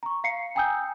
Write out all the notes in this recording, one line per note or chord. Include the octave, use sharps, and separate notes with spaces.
A#5 C#6
F5 A#5 C7 C#7
G5 G#5 A#5 D#6 E6 G6